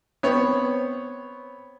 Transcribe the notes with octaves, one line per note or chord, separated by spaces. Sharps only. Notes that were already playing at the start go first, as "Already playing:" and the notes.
B3 C4 C#5